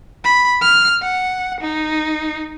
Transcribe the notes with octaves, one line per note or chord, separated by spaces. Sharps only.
B5
F6
F#5
D#4